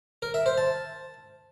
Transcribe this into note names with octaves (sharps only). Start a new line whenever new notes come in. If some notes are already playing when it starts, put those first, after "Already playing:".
A#4
E5
C5
A5